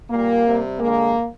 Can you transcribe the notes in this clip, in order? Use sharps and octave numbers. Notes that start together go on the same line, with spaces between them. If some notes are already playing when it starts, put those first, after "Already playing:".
A#2 G3 A#3
C3 G3
D3 G#3 A#3